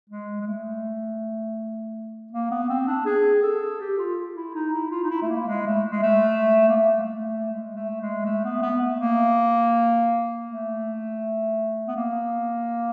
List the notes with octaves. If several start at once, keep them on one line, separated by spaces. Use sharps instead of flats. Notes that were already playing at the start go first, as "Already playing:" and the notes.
G#3
G#3
A3
A#3
B3
C4
D4
G#4
A4
G4
F4
E4
D#4
E4
F4
D#4
E4
A3
A#3
G#3
A3
G#3
A3
A#3
A3
G#3
A3
A3
G#3
A3
G#3
A3
B3
B3
A3
A#3
A3
B3
A#3